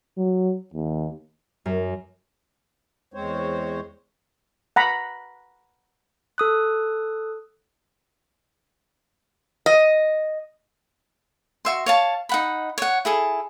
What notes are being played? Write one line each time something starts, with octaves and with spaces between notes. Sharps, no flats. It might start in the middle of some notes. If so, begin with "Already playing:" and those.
F#3
D#2
F#2
E2 G#3 C4 C5 C#5
F#5 A#5 B5
A4 D#6 F#6
D#5
F#4 E5 C6
C#5 F5 A5
D#4 F#5 B5
C#5 F#5
E4 G#4 A4